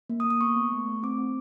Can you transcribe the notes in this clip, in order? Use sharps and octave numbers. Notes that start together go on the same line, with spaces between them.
A#3
D#6
A#3
D#6
B3 C#6
B3
A3
A3
C4 D6
C4